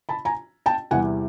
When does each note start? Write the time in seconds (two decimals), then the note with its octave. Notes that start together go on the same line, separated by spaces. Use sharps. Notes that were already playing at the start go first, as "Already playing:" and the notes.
0.09 A5 B5
0.25 G#5 A#5
0.66 G5 A5
0.91 E2 C3 E3 G3 F#5 G#5